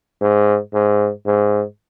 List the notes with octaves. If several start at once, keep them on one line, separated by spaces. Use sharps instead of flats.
G#2
G#2
G#2